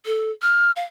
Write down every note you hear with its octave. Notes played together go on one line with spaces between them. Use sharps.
A4
F6
F5